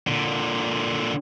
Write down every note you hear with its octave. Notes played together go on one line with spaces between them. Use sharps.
A#2 D3